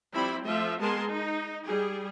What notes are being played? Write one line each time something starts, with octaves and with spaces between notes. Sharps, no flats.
F3 G3 C4 E4 B5
F3 A3 F4 E5
G#3 B3 G#4 A#4 A5 C6
D#4
G3 G#4